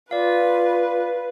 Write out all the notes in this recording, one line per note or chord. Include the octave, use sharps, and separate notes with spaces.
F4 B4 D5 F5